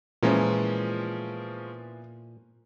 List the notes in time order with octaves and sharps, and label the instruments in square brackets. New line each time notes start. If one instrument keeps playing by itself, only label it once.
[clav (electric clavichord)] A#2 [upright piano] E3 B3 C5 [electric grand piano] F3 G#3 C#4